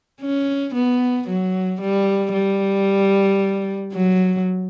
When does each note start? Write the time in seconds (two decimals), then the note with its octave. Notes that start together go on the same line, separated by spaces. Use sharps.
0.21 C#4
0.74 B3
1.28 F#3
1.81 G3
2.33 G3
3.92 F#3